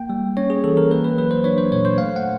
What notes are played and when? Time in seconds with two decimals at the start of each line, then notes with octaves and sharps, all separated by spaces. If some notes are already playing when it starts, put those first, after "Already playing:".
Already playing: A#3 G5
0.10 G3
0.37 C#4 C#5
0.50 G#4
0.64 E3 A4
0.77 A#4
0.91 A#3 B4
1.04 B4
1.18 F#3 B4
1.31 C5
1.44 D4 C#5
1.58 C5
1.72 A#2 C#5
1.85 C5
1.98 A3 F5
2.16 F#5